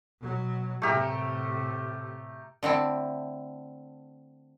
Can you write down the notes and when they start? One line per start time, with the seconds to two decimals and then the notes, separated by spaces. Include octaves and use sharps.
0.20 B2 F#3
0.82 A2 C3 A3 G4 A#4
2.63 D3 A3 C4 E4